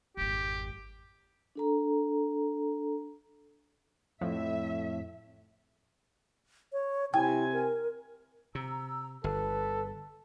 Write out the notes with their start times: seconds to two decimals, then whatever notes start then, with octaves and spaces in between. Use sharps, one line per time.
0.17 G#1 F2 G4
1.55 D4 A4 A#5
4.21 F2 A2 F3 E5
6.72 C#5
7.14 C3 E4 G5 G#5
7.52 A#4
8.55 C3 A#5 E6
9.24 G1 A4 B4